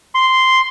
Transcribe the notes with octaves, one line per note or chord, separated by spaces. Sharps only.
C6